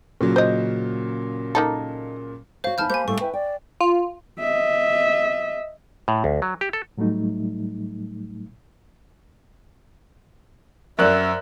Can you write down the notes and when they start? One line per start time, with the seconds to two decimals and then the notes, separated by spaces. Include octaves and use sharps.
0.21 A#2 C#3 F#3
0.36 C5 D#5
1.55 A#3 D#4 A4
2.64 F#4 C5 C#5 F5
2.78 E2 D#4 G#5 A5 B5 F6 G6
2.90 A#3 G4 C5 G#5 G6
3.08 A2 G3 A#3 A4 C#6
3.20 B4 E5 G5
3.33 D5 G5
3.81 F4
4.40 D#5 E5
6.08 A2
6.24 D2
6.42 F#3
6.61 G4
6.73 A4
6.97 A2 F#3 G3 A3 D#4
10.99 F#2 A#4 C5 D5 E5 F#6